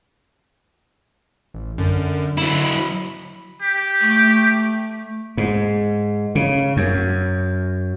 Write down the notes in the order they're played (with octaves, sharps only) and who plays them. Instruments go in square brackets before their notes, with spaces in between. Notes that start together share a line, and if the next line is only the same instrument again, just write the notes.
[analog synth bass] A1
[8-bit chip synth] F#2 [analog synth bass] D3
[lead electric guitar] F#3 E4 [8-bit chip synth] B5
[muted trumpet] G4
[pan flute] A3
[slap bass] G#2
C#3
F#2